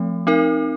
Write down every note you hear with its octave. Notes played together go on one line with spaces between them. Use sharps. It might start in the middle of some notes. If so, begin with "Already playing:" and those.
Already playing: F3 A3 C4
C4 D#4 A#4